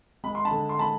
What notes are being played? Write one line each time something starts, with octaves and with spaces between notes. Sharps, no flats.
G#3 B5
C6
A5 B5
D3
C6
G#3 A5 B5